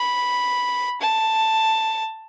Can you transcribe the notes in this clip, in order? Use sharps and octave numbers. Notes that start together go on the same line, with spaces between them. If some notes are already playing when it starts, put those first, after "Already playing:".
Already playing: B5
A5